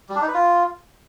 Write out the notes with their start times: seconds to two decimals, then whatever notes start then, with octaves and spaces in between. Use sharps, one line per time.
0.09 G3
0.15 D4
0.22 D#4
0.28 B4
0.34 F4